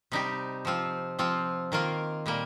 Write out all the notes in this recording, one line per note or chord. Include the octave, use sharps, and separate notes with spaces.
C3 G3 D#4 G4
F3 C4 F4
F3 C4 F4
D#3 A#3 F4
A#2 G3 A#3